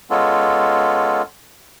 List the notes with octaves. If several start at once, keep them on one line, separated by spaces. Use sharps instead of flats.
G#3 B3 C#4 F4 A4